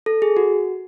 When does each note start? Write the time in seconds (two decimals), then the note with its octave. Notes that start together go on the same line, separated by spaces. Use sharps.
0.06 A4
0.22 G#4
0.37 F#4